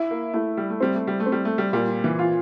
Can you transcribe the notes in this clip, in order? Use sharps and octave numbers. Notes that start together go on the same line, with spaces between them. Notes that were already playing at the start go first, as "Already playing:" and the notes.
Already playing: E4
A#3
A3 E4
G3
A3
G3 C4
A3
G3
A3
C4
G3
A3
G3
A#2 G3
E3
F4